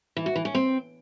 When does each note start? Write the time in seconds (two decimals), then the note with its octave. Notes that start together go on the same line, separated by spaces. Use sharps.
0.17 E3
0.26 F#4
0.36 E3
0.45 C#4
0.55 C4